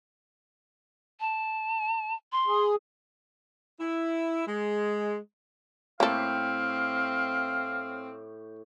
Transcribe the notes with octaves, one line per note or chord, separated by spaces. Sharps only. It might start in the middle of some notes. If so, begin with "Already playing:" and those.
A5
C6
G#4
E4
G#3
A2 A#3 C4 G4 A4 C#5 F5